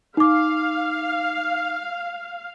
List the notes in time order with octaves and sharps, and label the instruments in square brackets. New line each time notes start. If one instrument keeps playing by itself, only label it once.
[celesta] D#4 D6 [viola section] F5